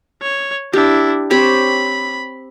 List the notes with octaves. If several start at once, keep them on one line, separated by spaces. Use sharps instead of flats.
C#5
D4 E4 G4
C4 G4 C#5 B5